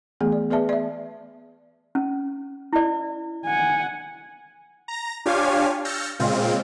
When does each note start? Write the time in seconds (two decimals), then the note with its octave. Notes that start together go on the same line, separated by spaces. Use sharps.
0.21 E3 A3 B3 G#4
0.32 D5
0.51 B3 G#4 B4 D5 E5 A5
0.69 D5 E5
1.95 C#4
2.73 E4 D5
3.45 F#5 G#5
4.88 A#5 A#6
5.26 D4 F4 G4 C#5 F5 G#5
5.85 E6 F6 G6 A6 A#6 C#7
6.19 A#2 C#3 G#3 C4 F4